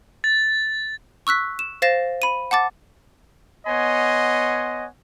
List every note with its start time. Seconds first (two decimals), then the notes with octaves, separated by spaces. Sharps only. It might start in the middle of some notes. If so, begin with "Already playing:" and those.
0.24 A6
1.27 C#6 E6 F#6 B6
1.59 E7
1.82 C5 F5 A6 A#6 E7
2.22 B5 D#7
2.51 F#5 A5 D6 A6
3.67 B3 C#5 D#5 F#5 G#5 C6